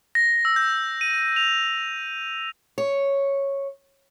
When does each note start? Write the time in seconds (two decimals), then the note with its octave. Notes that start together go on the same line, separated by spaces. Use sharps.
0.15 A#6
0.45 E6
0.56 G6
1.01 D#7
1.36 F7
2.78 C#5